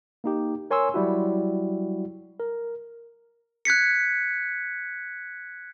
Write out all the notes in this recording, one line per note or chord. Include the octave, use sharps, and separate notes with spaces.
A#3 D#4 G4
A#4 C#5 G#5 C6 C#6 E6
F#3 G3 E4 F#4
A#4
F#6 G#6 B6 C#7